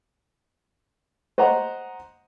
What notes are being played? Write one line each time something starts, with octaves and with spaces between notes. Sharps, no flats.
C5 D#5 F#5 A#5